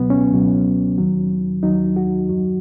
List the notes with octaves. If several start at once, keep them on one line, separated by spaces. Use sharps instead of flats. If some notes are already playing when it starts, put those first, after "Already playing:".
Already playing: C#2 B2 F#3 B3
C#4
C#2 B2 F#3
D#2 D#3 F#3
D#2 D#3 F#3 D#4
F#4
F#2 F#3